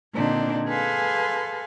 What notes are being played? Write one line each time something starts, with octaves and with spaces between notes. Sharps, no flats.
A#2 D3 C4 D4 D#4
G#4 A4 B4 F5 G#5 C6